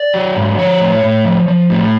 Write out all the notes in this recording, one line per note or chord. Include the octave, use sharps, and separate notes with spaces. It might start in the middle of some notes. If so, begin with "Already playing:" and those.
Already playing: D5
F#3
G#2
F3 C#5
A2
A2
F3
F3
A2